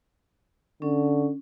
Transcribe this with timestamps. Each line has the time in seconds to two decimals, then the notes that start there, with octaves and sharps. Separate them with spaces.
0.82 D3 C#4